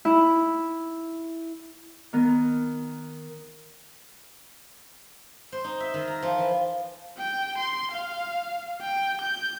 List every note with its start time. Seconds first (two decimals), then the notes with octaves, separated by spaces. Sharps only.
0.05 E4
2.13 D#3 B3 A#4
5.52 C5
5.64 D#4
5.80 E5
5.94 D#3
6.08 A#5
6.23 F3
6.38 E3
7.18 G5
7.58 C6
7.92 F5
8.81 G5
9.21 G6